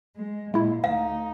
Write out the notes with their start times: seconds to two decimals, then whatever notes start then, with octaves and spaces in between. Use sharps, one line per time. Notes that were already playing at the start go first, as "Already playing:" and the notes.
0.15 G#3
0.54 A#2 G#3 E4
0.84 D2 D#4 F5